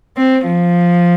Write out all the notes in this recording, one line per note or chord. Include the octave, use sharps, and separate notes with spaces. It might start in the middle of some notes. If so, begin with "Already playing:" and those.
C4
F3